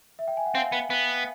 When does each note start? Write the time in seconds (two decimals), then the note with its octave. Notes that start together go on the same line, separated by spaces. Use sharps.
0.19 E5
0.28 G5
0.37 G#5
0.46 F#5
0.55 C4 F5
0.72 B3
0.90 B3